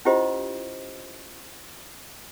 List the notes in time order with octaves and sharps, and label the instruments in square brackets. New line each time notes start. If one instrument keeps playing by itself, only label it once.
[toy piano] C#4 E4 F4 G4 C5 D#5